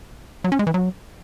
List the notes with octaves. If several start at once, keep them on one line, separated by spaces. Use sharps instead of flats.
F#3
C#4
G#3
E3
F#3